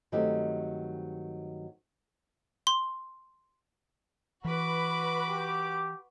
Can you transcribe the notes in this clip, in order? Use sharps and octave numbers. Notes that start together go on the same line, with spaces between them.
G2 D#3 F#3 A3 C4 G4
C6
E3 F#4 B4 B5 D6
G4